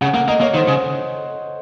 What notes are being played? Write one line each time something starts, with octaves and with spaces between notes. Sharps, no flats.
C#3 F#5
A#3 F#5
A#3 D#5
A#3 C#5
D#3 C5
C#3